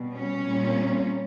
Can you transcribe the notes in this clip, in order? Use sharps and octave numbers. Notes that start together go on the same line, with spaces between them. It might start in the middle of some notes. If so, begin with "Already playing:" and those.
Already playing: B2 G3
C#4
A#2 G3